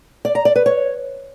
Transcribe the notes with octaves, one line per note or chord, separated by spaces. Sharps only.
D5
A#5
D5
B4
C#5